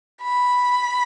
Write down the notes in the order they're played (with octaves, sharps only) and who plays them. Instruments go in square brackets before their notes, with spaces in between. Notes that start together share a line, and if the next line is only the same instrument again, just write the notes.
[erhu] B5